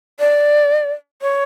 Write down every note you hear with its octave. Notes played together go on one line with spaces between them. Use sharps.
D5
C#5